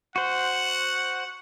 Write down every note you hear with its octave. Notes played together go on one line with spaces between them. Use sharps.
F#4 C5 F#5